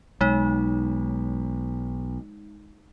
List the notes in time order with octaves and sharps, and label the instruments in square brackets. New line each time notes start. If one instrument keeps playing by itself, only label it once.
[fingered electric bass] B1 [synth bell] G#3 D#4